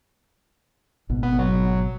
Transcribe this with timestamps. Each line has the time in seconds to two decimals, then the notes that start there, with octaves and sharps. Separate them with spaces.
1.09 G#1 B2
1.23 B3
1.39 F#3